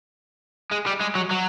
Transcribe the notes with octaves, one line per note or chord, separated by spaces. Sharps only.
G#3
G3
G#3
F#3
F#3